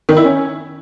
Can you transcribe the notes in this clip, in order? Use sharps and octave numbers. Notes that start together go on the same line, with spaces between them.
D#3
E4
C#4